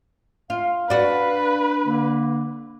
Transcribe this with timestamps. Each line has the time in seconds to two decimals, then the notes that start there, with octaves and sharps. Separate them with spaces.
0.50 F4 F5
0.90 D4 F#4 B4
1.84 D3 A#3